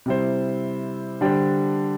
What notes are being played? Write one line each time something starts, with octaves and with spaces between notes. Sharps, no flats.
C3 G3 E4 C5
D3 G3 D4 G4 C5